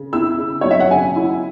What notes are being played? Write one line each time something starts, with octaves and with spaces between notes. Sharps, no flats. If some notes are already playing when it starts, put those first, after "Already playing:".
Already playing: C#3
E4 E6
C#3
F#3 C#5
E5
F#5
C#3 G#5
E4